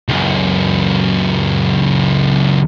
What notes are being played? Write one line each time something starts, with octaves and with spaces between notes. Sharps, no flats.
C#2 F#2